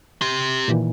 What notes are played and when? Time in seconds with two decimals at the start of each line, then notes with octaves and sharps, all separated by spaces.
0.21 G4 C6
0.68 A#2 D#3 E3